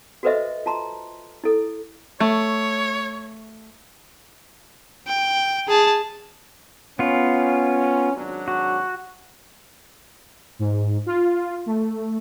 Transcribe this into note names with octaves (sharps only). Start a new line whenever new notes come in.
F#4 A4 B4 C5 D#5 E5
F4 A5 A#5 C6
E4 A4
A3 C#5
G5
G#4 A5
B3 C#4 F4
G#1 F#3 D4
F#4
G#2
F4
A3